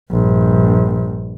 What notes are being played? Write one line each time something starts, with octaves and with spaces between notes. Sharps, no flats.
A#1 G2